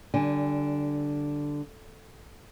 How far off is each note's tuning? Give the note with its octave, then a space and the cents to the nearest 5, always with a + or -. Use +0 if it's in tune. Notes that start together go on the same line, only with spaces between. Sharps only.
D3 +0 G3 -25 G#5 -20